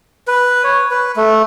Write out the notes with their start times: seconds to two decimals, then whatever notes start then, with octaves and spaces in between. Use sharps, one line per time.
0.28 B4
0.64 C#5
0.91 B4
1.16 A3